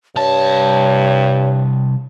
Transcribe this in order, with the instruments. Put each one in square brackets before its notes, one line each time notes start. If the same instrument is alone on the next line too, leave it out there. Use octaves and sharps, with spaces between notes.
[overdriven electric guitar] C2 A5 [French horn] G2 [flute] C#5